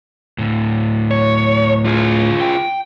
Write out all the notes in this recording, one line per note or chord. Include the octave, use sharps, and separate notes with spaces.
D2 A2
C#5
F4 G#4
G5